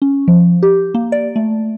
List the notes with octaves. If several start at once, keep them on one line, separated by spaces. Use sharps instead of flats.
C#4
F3
G4
A#3
D5
A3